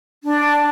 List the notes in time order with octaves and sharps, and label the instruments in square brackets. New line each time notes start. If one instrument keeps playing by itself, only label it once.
[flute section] D4